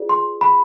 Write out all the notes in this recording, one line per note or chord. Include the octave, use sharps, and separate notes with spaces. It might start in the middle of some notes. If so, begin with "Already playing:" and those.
Already playing: F4 G#4 B4 D5
C6
B5